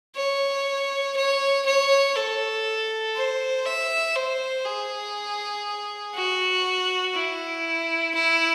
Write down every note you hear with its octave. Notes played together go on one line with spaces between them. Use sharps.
C#5
C#5
C#5
A4
C5
E5
C5
G#4
F#4
E4
E4